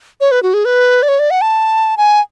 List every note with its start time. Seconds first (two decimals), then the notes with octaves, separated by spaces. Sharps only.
0.21 C#5
0.31 B4
0.43 F#4
0.54 G#4
0.65 B4
1.03 D5
1.08 C#5
1.19 D5
1.31 F#5
1.41 A5
1.97 G#5